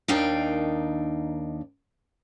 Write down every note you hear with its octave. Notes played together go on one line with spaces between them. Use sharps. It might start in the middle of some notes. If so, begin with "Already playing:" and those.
D#2 D#3 D4 D#4 F5 G5